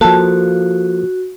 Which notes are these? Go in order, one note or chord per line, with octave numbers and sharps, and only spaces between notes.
F3 A#3 F#4 A4